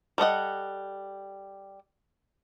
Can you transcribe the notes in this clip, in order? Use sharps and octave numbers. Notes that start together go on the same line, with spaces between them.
G3 A4 D#5 F#5